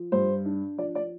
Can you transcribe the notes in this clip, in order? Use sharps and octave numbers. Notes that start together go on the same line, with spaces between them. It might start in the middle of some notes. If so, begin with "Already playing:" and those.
Already playing: F3
G2 C5
D4
F3 D5
D5